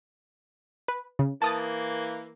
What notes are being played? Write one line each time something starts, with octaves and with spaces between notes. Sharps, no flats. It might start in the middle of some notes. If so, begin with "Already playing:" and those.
B4
C#3
E3 A#3 A5 D#6 A6